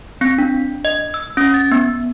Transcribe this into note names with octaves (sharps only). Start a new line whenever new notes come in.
C4
D4
D#5
E6
C#4
A6
B3